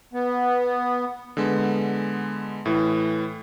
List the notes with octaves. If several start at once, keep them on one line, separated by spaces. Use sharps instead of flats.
B3
D3 G#3 B3
A2 E3